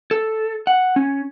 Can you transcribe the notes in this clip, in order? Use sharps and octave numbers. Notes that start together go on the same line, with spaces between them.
A4
F#5
C#4